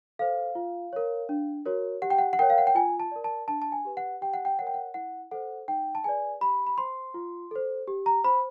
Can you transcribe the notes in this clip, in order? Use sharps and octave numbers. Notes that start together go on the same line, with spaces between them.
A4 C5 F5
F4
A#4 C#5
D4
F#4 A#4 C#5
G4 F#5
G5
F#5
F#5
A#4 C#5 G5
F5
F#5
G5
F4 G#5
A5
A#4 D5
A5
D4 A5
A5
G#5
G4 B4
F#5
G4 G5
F#5
G5
A#4 C#5 F#5
G5
F#5
E4 F#5
A4 C5 F#5
D#4 G5
A5
G#4 B4 D5 G#5
G4 B5
B5
C5 C6
F4
A4 C5
G4
A#5
C5 B5